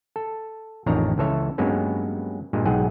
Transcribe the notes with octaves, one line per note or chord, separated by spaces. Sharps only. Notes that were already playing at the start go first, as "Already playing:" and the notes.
A4
A1 F2 D#3 D4 C#5 A#5
C#2 E3 A4 C#5 E5
G2 F#3 G#3 A#3 B3 C#4
G2 A#2 G#3
B1 G#2 F#3 G#4 F#5 G5